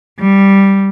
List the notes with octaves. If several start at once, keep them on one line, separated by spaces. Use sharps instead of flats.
G3